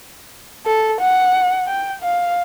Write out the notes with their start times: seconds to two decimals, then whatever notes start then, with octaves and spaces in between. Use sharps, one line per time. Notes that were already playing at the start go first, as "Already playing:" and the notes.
0.66 A4
1.01 F#5
1.67 G5
2.02 F5